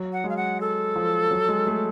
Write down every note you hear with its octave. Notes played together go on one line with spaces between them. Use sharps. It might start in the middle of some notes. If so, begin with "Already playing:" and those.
Already playing: F#3
F#5
G#3 F5
F#5
A4
F3
F#3
G#3
A3